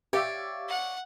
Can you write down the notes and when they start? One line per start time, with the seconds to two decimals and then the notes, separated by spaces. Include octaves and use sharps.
0.13 G4 C#5 D5 E5 F5 E6
0.69 F#5